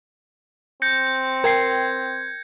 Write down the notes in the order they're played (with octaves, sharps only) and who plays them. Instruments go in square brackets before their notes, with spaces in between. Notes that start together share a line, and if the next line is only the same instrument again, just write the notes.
[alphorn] C4 [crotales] G6 A#6 C#7
[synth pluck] A#4 G5 C7 [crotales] G#6